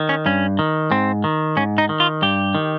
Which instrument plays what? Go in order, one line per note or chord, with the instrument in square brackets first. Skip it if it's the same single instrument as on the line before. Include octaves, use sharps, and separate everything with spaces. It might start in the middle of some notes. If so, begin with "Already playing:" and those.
Already playing: [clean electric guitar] D#3
C#4
G2 C#4
D#3
G#2 C4
D#3
G#2 C#4
D#4
D#3
F4
G2 G4
D#3